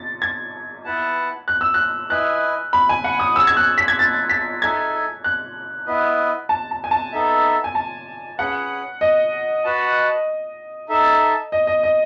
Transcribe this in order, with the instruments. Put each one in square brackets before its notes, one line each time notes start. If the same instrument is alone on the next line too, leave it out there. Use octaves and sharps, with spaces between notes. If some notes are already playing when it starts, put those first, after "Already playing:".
Already playing: [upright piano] A6
G#6
[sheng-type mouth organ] B3 E4 B4 F#5 A5
[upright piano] F#6
E6
F#6
[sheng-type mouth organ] E4 B4 D#5 G#5 [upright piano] F#6
[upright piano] B5
G#5
F#5
D#6
[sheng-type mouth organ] C#4 G#4 C#5 F#5 A5 [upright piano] E6
[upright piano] G#6
F#6
B6
G#6
A6
B6
[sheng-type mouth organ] D#4 A4 E5 G#5 [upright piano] G#6
[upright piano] F#6
[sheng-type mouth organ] B3 E4 B4 D#5
[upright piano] A5
A5
G#5
A5
[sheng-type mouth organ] B3 D#4 A4 E5
[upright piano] G#5
A5
[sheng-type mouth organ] C#4 G#4 B4 [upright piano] F#5
[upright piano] D#5
[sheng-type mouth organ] F#4 B4 F#5 A5
D#4 A4 E5 A5
[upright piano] D#5
D#5
D#5